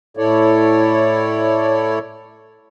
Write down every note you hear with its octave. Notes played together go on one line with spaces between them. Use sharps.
A2 E4 A4 C#5 D5